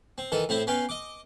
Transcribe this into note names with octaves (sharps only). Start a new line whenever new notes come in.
C4
D#3 E3 A4
A2 C4 E4 C5
B3 C#4 F5 G5
D#5 D6